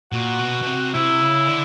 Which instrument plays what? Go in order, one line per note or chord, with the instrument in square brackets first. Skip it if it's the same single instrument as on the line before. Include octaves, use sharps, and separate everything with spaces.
[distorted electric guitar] A#2 [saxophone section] F#4
[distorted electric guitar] B2
B2
C3
[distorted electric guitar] C3 [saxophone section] E4
[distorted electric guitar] C#3
D3